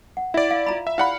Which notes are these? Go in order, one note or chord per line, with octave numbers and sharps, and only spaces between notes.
F#5
E4 D5 E5
F5
F4 A#5 B5
E5
E4 G4 D5 F5 F#5 B5